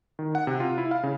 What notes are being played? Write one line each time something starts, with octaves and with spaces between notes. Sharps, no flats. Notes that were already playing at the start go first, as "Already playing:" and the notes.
D#3
F#5
C3
F4
E4
F5
C#3